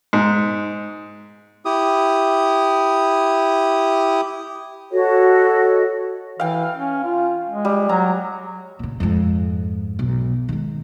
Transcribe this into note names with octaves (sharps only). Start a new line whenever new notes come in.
G#2
E4 G4 D#6
F#4 A4 C#5 D#5
E3 F5 G5
C#4
F4
G#3
G3
F#3 A#5
A#2 C#3
F2 G#2
B1
D#3 G#3